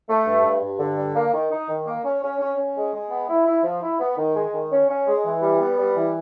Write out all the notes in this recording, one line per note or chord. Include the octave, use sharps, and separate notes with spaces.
A3
G2
G2
G2
D3
G3
A#3
D#3
D#4
D#3
A#3
C#4
C#4
C#4
C#4
G#3
G#3
B3
E4
E4
F3
E4
B3
D#3
G#3
D#3
C#4
C#4
G#3
E3
G3
B3
G3
E3